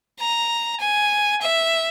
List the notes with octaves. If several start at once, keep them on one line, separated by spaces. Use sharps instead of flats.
A#5
G#5
E5